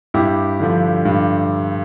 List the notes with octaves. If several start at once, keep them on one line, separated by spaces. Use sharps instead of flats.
G2 E4 G4
D3 F3
G2